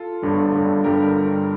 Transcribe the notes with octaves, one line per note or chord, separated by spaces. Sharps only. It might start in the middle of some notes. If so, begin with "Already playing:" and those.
Already playing: F4 A4
G1 G2 D3 G3
G1 G2 D3 G3
G2 D3 G3 G4 A#4